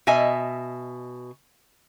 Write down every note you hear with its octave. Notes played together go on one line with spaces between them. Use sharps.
B2 D#5 E5 G#5